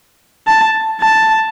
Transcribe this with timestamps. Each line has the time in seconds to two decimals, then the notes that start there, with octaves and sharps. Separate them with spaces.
0.47 A5
1.01 A5